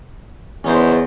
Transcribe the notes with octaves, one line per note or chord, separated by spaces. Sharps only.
E2 C#4 D#4 C5